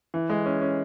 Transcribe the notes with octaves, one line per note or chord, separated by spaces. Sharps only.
E3
G#3
C#4
C#4